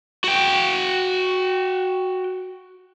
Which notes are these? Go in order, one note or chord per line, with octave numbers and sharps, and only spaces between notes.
F#4 G5